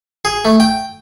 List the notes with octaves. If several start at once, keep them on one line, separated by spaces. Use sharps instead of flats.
G#4
A3
G5